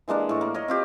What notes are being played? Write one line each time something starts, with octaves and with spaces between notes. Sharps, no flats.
E3 G#3 A#3 D4
A2 C#6
A#3
A#4 C#5 D#5
C4 F4 G4